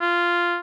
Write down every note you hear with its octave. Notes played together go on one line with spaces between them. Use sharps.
F4